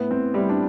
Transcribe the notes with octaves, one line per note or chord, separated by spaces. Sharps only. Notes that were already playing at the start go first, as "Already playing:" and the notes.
Already playing: A2 B3
C4
G3 E4
D4